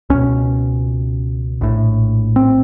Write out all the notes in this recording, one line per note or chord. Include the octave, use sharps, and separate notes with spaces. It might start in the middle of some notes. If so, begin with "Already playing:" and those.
C#2 B2 C#4
A#1 A2
C4